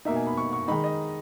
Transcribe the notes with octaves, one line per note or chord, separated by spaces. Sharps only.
B2 A#3 D#4 E5
G#5
B5
C#6
C#6
D#3 G#3 D#4 B5
D#5